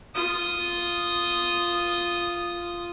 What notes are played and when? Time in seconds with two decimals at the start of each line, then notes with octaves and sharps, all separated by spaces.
0.15 F4 D#6